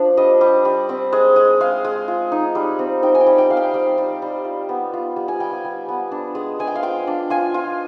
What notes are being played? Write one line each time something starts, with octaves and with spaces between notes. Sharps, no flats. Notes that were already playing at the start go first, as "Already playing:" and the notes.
Already playing: F3 D4
G3 D#5
G3
G3
C4
G#3
G#3
G#3 F5
G#3
F4
D#4
G3
C4
D#4 G5
G#5
G5
G3
G5
C4 F5
G5
G3
G3
G3
F4
B3
F4
G3
G#5
G3 G5
G#5
G3
B3
D4
G#3
G#3 G#5
G5
F5
F4 G5
D4
F4 G#5
F4